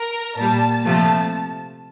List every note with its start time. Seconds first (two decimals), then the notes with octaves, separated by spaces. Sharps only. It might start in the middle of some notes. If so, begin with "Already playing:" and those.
Already playing: A#4
0.37 A#2 G3 A5
0.85 C3 F3 A3 A5